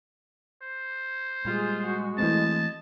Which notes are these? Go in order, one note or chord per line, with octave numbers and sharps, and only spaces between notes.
C5
A#2 G3 G#3 F4 G#4
F#4
E3 A3 C4 D#5 A5